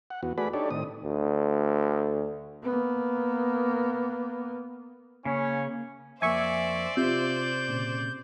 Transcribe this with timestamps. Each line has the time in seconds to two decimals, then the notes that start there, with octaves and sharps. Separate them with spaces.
0.10 F#5
0.23 E2 B3 F#4
0.38 A3 F#4 G#4 B4 D5 B5
0.53 D4 D#4 G4 A4 C#5 D5
0.70 A2 D#3 C4 D#6
1.04 D2
2.63 A#3 B3
5.25 C#3 A#3 C#4 C#5
6.22 F2 A#3 C5 D5 E5 G#5 C#6
6.97 C3 F4 E5 G6
7.68 A#2 C#3